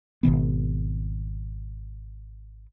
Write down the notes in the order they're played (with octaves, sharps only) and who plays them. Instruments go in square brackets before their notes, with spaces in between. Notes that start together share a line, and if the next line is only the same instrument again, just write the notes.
[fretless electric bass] G#1 B2 D#3 B3